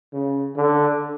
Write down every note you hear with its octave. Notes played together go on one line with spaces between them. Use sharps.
C#3
D3